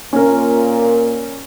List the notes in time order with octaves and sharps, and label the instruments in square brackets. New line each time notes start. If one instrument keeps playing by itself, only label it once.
[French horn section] A#2 [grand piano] C#4 A#4